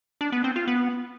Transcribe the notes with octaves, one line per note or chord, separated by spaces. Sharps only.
D4
B3
C4
F4
B3